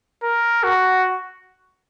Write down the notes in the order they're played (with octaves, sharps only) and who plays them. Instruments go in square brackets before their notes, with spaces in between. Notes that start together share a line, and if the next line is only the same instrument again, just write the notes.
[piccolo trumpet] A#4
F#4